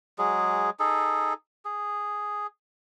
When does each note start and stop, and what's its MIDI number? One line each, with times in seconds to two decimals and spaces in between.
0.19 0.70 54
0.19 0.70 56
0.19 0.70 68
0.79 1.33 63
0.79 1.33 68
0.79 1.33 69
1.65 2.47 68